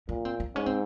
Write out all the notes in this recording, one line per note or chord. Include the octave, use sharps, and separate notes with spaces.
A#2 C#4
C4
C4
G#2 C#4
C4